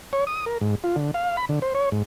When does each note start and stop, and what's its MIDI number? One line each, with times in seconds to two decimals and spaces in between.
0.13 0.24 73
0.27 0.45 87
0.46 0.58 70
0.61 0.75 44
0.84 0.96 65
0.96 1.11 50
1.14 1.37 77
1.37 1.45 83
1.49 1.59 50
1.62 1.73 72
1.75 1.89 73
1.92 2.03 44